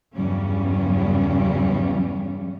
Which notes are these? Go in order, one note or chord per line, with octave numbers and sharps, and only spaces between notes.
E2 G2 C#3 F#3 G3 C#4